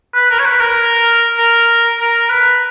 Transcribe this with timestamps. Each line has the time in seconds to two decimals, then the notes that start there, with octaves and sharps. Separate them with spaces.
0.15 B4
0.31 A#4
0.39 C#5
0.46 B4
0.61 A#4
1.38 A#4
2.00 A#4
2.30 B4